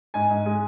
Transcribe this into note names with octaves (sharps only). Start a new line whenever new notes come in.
G#2 G#5
G#2
G#3